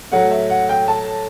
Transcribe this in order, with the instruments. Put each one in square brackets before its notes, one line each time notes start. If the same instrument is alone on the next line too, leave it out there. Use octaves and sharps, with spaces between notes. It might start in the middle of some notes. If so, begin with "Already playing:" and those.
[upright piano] A2 F#3 A3 F#5
E5
F#5
G5
A5